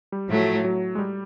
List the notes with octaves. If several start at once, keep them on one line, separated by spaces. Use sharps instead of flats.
G3
A2 F3 F#3 A3
F#3
G#3
G3